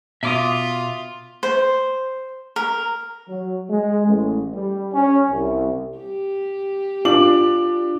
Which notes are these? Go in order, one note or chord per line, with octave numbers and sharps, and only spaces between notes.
B2 F4 E5 D6 D#6
C5
A#4
F#3
G#3
A1
G3
C#4
C2
G4
D4 F4 D6 F#7